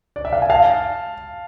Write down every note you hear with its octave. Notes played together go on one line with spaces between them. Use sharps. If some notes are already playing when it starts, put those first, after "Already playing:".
D5
E5
F5
G#5
F5 A5